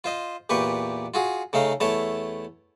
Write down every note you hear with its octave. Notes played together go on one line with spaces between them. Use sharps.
F4 C5 D#5
E2 A#2 G4 B4 C#6
F4 F#4 G#4
C#3 A3 D#4 F5
E2 A3 E4 C#5 A5